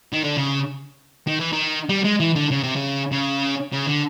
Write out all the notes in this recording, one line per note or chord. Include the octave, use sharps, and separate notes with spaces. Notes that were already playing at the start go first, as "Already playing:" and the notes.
D#3
D3
C#3
D#3
E3
D#3
G3
G#3
E3
D3
C#3
C3
C#3
C#3
C#3
D3